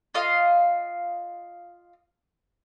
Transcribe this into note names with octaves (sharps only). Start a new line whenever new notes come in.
F4 D#5 F5